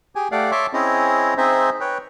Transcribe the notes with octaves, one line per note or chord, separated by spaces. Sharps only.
G4 G#4 G#5
A3 G4 D5 F5 F#5
C#5 E5 A5 C6 D6
C4 C#4 E4 G#4 D#5
C4 D#4 G#4 C5 D#5 E5
B4 C#5 G5